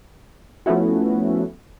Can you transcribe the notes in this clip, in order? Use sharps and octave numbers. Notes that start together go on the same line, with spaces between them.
F3 A3 B3 C#4 E4 F#4